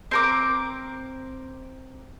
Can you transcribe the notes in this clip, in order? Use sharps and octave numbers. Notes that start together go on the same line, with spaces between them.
C4 A#4 D6